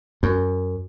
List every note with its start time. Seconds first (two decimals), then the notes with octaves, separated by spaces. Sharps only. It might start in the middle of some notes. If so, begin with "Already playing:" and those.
0.23 F#2